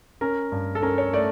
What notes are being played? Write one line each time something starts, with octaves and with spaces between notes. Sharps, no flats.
C#4 A#4
G2
A4
C#4 A#4
C#5
A3 D5